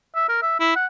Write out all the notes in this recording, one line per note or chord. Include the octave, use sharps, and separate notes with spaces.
E5
A#4
E5
E4
F#5